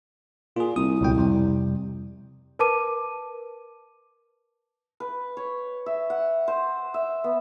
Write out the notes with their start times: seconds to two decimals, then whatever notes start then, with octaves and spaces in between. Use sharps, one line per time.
0.56 A#2 F4 G#4
0.76 C2 D#6
1.01 C#2 B2 G5
1.16 F2 C3 G3
2.59 A#4 B4 A5 D6 D#7
5.00 B4
5.37 C#5
5.86 E5
6.10 F#5
6.48 C5
6.94 E5
7.24 B3